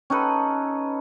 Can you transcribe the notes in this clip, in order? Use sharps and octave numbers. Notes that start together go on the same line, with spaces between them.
C#4 D#4 A4 B4